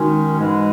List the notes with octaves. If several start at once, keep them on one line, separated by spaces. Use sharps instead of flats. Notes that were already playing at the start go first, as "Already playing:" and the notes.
Already playing: D#3 G#3 C#4 D#4 F#4
G#2 E3 G#3